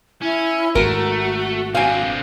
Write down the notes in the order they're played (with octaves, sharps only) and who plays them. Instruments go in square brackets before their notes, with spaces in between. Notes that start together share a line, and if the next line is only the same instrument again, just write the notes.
[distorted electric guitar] C#4 [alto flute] E4
[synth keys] G#1 [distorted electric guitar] A3 [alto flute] F#4 [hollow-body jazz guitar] A#4
[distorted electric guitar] D3 C4 [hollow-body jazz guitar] F5 G#5